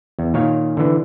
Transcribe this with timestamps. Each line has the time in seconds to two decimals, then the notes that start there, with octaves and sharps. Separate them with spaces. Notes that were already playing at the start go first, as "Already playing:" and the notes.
0.19 E2
0.34 A#2 D#3 C#5 F5
0.77 D3 E3